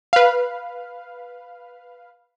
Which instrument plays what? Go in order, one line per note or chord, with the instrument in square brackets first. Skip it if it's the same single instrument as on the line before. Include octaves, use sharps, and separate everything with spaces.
[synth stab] B4 F5